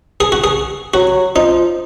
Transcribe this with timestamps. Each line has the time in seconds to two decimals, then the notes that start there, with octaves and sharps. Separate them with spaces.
0.20 G#4
0.32 F#4
0.44 G#4
0.94 F#3 F#4
1.35 F3 D#4